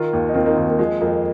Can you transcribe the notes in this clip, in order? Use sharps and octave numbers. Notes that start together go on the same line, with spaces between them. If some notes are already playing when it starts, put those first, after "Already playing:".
Already playing: D#3 F4 A#4
D#2
D#4
D#3 C4 F4
A#3 D#4
D#2 A#3
A#3
F3 G#3
F2 A#3